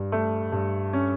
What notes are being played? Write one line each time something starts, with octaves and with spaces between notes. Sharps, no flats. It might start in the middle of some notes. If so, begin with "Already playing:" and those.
Already playing: G2
A3
G2
C#4